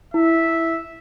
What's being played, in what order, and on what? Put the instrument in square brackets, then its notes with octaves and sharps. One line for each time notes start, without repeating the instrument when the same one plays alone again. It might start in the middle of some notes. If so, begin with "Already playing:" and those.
[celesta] E4 [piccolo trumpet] E5